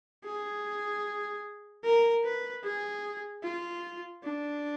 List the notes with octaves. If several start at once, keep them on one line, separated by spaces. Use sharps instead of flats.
G#4
A#4
B4
G#4
F4
D4